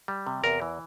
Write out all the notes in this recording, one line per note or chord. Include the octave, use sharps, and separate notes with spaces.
G3
C3
E2 A#4
E3